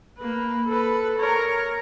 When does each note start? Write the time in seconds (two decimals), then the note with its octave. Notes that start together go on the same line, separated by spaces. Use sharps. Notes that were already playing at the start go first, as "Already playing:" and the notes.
0.18 A#3 B4
0.67 A4 B4
1.19 A#4 C#5